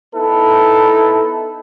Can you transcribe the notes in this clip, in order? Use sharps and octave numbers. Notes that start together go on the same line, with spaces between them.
B3 D#4 E4 A4 B4